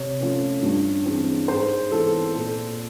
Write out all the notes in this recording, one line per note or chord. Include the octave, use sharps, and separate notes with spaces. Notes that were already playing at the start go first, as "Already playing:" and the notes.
Already playing: C3 C#5
F3 A3 C#4
G2
E3 G#3 C4
G#2 C5
E3 G#3 B3 A4
A#2 A4